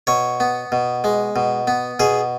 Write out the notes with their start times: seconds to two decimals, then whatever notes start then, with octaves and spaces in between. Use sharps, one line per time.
0.07 B2 C#5
0.40 B3
0.72 B2
1.04 G#3
1.36 B2
1.67 B3
2.00 B2 G#4